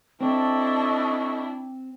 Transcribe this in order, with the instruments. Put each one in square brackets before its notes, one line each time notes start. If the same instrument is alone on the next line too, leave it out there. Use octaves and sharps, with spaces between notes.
[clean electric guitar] C4 [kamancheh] D4 E4 [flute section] A4 D#5 C#6